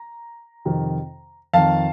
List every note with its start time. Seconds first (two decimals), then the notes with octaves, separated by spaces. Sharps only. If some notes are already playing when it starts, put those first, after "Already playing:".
Already playing: A#5
0.65 F2 C3 D#3
1.53 F2 D#3 F5 A5